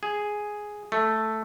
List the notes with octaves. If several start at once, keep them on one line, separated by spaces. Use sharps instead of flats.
G#4
A3